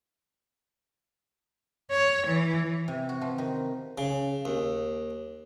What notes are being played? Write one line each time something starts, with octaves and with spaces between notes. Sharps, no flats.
C#5
E3
C3
F#4
F3
D#3
C#3
D#2